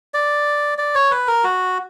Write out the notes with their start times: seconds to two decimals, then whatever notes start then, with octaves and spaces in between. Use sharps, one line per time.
0.14 D5
0.78 D5
0.95 C#5
1.11 B4
1.27 A#4
1.44 F#4